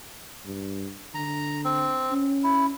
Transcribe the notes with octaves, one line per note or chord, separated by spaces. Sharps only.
G2
D3 A#5
C4
C#4
E4